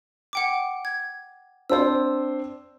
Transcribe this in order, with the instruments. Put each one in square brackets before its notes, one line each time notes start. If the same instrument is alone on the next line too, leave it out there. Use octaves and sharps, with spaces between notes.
[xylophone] F#5 G5 D6
G#6
[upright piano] C4 D4 C5 [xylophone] D5 E6